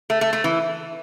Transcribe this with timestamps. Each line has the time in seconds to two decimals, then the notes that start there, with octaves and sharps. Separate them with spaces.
0.10 A3
0.21 A3
0.33 A3
0.44 E3